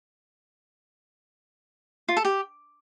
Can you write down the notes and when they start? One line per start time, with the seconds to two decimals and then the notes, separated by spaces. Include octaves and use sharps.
2.09 F4
2.17 A4
2.25 G4